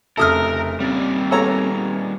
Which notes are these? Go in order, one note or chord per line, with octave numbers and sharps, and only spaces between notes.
F1 C#3 A4 A#4 E5 D#6 F6
A#2 G3 C4 C#4
A#3 B3 G#4 A4 C#5 A#5